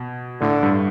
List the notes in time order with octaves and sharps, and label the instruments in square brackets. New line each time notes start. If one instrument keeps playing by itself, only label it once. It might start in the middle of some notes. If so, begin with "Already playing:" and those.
Already playing: [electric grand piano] B2
[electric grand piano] A2 [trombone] D3
[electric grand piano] G2